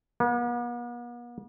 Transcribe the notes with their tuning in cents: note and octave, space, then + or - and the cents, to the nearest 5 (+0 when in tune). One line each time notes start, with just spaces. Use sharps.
B3 -45